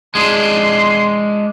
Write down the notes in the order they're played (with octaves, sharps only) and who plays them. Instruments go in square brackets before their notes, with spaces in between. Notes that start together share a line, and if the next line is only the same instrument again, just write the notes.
[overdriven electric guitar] G#3 D4 [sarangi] C6